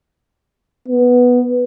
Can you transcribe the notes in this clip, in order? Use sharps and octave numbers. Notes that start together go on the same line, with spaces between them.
B3